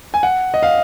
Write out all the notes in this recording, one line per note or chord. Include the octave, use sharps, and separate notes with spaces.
G#5
F#5
D#5
F5